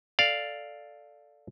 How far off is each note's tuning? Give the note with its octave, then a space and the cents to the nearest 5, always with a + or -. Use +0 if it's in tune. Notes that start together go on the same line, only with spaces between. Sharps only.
A4 +0 D5 +0 F5 +0